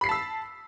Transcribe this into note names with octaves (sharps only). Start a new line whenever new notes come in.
A5 B5 E6 B6 C7